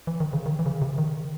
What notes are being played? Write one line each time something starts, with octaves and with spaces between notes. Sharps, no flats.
E3
D#3
C#3
D#3
E3
C#3
D#3
C3
C#3
D#3